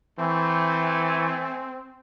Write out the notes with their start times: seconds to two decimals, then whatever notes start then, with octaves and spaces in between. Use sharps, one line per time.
0.19 E3 A3 C4 G#5